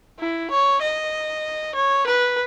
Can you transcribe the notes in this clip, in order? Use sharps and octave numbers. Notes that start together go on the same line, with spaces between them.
E4
C#5
D#5
C#5
B4